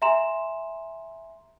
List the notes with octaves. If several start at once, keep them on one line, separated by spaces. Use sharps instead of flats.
E5 G#5 A#5 C6 E7